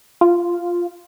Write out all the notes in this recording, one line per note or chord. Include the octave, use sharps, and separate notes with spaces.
F4